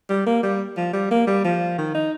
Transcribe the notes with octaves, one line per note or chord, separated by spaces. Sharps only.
G3
A#3
G3
F3
G3
A#3
G3
F3
D#3
D#4